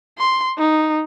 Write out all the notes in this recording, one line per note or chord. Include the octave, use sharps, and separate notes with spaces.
C6
D#4